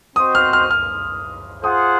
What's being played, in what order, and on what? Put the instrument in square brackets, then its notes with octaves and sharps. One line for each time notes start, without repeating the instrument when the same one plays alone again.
[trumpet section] C4 F#4 C5 D#5 [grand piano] D#6
[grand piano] F6
F6
F6
[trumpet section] F4 G#4 C5 F#5 [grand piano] D#6